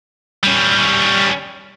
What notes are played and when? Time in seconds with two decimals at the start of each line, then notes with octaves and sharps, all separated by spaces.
0.43 G3 C#4